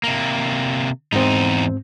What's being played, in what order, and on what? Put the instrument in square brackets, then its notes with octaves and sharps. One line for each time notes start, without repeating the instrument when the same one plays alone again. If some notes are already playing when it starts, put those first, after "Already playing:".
[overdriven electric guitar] C3 A#3
[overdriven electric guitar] E2 D#4 [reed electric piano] G#2 C4